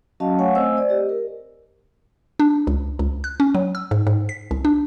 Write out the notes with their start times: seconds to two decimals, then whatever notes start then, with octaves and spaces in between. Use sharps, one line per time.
0.20 F#3 C#4 F#4 D#5 F5 A5
0.38 A3 C#5 F5 F#5 G#5 C#6
0.55 A3 C4 C5 D#5 G#5 E6
0.77 C5 D5
0.89 G4 D#5
1.09 A#4
2.40 D4
2.67 C#2
2.99 C#2
3.24 F#6
3.40 C#4
3.55 F#3
3.75 E6
3.91 G#2
4.07 G#2
4.29 B6
4.51 C2
4.65 D4